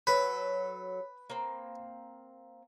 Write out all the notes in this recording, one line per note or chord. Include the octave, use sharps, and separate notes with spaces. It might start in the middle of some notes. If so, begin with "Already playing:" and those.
F#3 A4 B4
A#3 C4